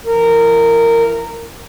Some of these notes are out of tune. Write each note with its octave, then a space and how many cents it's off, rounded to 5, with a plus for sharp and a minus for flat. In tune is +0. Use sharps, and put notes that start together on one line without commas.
E3 +30 A#4 -15